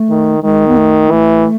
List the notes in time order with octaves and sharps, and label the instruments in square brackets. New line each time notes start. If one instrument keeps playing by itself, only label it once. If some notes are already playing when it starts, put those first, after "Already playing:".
Already playing: [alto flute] A3
[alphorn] D#3
[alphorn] D#3 [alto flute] G#3
[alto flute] B3
A3
[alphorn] E3 [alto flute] A3